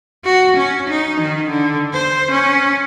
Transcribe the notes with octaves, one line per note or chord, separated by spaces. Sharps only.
F#4
C#4
D#4
D#3
D3
C5
C#4